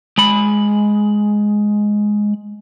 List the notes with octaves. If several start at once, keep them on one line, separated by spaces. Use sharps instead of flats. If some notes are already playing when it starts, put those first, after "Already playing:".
G#3 B5